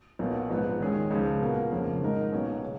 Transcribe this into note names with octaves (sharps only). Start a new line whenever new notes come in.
B1 B2 A#3
A#1 G#2 F3 B3
D#2 D#3 G#3 C#4 G#4
C#2 C#3 F3
B2 A#3 F4 A#4
F1 F2 C#3 F3 A#3
G#2 D#3 G#3 D#4 A#4
B1 B2 A#3 C#4 F#4
C#3